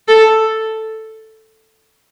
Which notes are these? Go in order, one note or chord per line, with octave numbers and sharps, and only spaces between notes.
A4